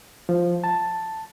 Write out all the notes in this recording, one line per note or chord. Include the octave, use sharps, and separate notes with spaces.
F3
A5